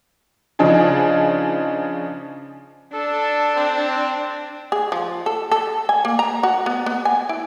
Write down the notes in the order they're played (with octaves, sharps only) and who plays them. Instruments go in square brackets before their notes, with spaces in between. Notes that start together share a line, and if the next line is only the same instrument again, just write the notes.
[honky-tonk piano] C#3 F3 D4 D#4 G#4
[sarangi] D4 [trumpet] A4
[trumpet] C4
[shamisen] G#4
F3
A4
A4
G#5
A#3
A#5
F#4
B3
B3
G#5
E4